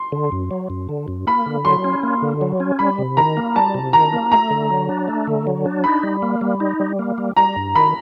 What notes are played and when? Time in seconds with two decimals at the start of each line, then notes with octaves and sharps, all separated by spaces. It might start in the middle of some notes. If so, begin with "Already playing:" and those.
Already playing: C6
0.12 D3
0.32 F#2
0.51 F#3
0.70 F#2
0.89 D3
1.08 F#2
1.27 A#3 B5
1.46 D3
1.65 F#3 C6
1.84 C#4
2.03 A#3
2.22 D3
2.41 F#3
2.60 C#4
2.79 G3 B5
2.99 C3
3.17 D#3 A#5
3.37 A#3
3.56 G3 A5
3.74 C3
3.93 D#3 A#5
4.13 A#3
4.32 A3 A#5
4.51 D3
4.71 F#3
4.89 D4
5.08 A3
5.27 D3
5.47 F#3
5.66 D4
5.84 D#4 B5
6.03 G3
6.22 A#3
6.41 G3
6.60 D#4
6.80 G3
6.99 A#3
7.18 G3
7.36 G3 A#5
7.56 G2
7.75 D#3 B5